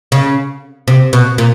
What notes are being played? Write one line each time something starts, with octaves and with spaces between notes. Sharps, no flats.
C#3
C3
B2
A#2